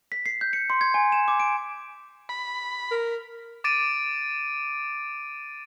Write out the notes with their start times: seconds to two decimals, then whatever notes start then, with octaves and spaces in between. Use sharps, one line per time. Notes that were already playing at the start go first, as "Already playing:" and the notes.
0.12 B6
0.26 C7
0.41 G6
0.53 C#7
0.70 C6
0.81 G#6
0.94 G#5
1.12 E7
1.28 D6
1.40 D7
2.29 B5
2.91 A#4
3.64 D6 A6 D7 D#7